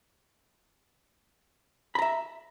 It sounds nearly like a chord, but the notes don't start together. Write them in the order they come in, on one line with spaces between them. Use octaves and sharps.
B5 A#5 E5